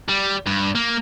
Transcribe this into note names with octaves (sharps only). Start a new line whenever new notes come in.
G3
G2
A#3